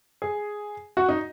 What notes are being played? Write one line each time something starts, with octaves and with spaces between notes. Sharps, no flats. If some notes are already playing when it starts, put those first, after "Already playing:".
G#4
F#4
D#4